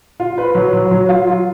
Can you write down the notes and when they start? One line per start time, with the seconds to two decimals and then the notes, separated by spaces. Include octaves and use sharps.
0.20 F4
0.38 B4
0.55 F#3
0.73 F#3
0.91 F#3
1.09 F4
1.27 F4